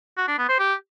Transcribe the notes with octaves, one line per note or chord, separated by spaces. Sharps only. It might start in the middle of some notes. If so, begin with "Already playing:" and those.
F#4
D4
B3
C5
G4